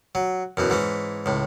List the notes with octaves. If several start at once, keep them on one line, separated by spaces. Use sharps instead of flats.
F#3
F#2 B2 E3
G#2 E3 C#4
C#2 A2